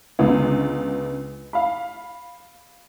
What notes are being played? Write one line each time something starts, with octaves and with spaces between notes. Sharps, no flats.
C#2 D3 G#3 B3
F5 B5